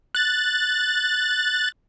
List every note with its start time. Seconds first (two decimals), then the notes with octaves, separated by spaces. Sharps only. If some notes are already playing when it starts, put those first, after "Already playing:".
0.15 F#6 A6